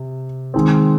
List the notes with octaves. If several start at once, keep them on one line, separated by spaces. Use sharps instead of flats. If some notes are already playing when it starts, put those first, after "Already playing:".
Already playing: C3
D#3 G#3 C4